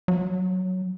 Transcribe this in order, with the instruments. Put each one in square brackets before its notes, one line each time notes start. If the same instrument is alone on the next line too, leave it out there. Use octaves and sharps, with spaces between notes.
[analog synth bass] F#3